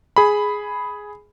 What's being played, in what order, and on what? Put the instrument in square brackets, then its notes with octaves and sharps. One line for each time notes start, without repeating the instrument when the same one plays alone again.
[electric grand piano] G#4 B5